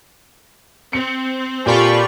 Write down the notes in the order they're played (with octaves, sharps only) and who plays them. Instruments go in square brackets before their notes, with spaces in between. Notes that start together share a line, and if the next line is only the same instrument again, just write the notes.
[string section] C4 [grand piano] C#7
[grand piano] A#2 [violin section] F4 A4 C#6 [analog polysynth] G4 D5 B5